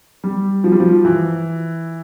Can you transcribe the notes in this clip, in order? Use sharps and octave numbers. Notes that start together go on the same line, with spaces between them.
G3
F3
G3
F3
E3